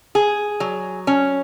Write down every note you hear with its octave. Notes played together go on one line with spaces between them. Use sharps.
G#4
F#3
C#4